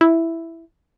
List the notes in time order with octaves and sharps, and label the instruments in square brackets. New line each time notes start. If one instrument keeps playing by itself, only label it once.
[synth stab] E4